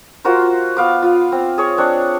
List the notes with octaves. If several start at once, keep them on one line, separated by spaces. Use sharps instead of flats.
F4 F#4 A#4 C5
B3 F5 D6
F4
C4
G#4 C#5
C4 D4 C#5